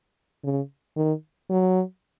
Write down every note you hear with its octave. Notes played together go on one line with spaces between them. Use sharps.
C#3
D#3
F#3